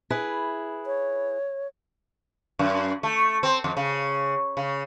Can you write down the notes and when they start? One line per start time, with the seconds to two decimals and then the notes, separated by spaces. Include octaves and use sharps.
0.10 E4 G#4 B4
0.86 C#5
2.59 F#2
3.03 A3
3.43 C4
3.64 F2
3.77 C#3
4.57 C#3